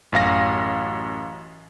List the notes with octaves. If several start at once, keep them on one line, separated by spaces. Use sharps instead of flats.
A1 F#2 F5 A#6